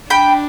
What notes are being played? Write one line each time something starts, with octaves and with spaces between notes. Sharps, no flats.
D4 G5 B5